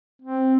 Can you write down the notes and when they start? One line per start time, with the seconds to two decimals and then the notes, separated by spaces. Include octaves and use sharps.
0.22 C4